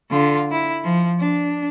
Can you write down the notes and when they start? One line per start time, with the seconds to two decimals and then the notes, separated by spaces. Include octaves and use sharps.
0.11 D3 F4
0.51 E4
0.84 F3
1.19 D4